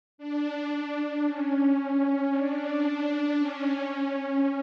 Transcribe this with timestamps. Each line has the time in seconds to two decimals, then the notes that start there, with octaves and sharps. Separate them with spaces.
0.18 D4
1.26 C#4
2.32 D4
3.39 C#4